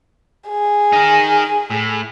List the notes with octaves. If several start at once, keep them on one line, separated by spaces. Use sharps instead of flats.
G#4
D#4 A#4
A2